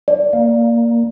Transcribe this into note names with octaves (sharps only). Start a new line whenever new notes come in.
D5
A#3